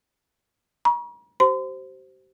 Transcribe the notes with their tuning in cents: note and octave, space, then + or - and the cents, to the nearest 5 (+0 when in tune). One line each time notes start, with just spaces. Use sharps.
A#5 +45 C#6 +10
G4 -45 C5 +0 C6 -40